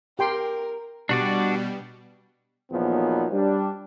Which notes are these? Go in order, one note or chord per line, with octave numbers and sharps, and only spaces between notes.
G4 A#4 G5 C6
B2 G3 D4 F#4 D5
E2 A#2 F3 F#3 B3 D#4
G3 D4